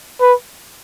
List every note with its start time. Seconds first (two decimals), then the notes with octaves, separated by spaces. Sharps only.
0.21 B4